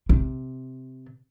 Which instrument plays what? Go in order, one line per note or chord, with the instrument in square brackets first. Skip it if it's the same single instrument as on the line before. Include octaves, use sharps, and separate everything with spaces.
[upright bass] C3